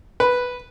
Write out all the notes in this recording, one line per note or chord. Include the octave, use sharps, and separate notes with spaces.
B4